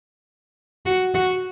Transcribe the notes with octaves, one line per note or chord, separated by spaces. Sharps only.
F#4
F#4